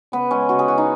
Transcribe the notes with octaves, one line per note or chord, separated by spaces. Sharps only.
C#3 B3
G#3 C#4
C#3 F#4
G#4
E3 F#4
D#4